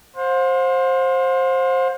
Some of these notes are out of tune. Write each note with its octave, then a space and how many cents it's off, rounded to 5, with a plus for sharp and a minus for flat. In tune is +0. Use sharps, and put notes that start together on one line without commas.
C5 +15 F5 +45